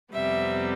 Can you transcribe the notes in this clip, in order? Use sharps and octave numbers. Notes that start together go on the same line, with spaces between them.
F2 C3 G3 B3 E5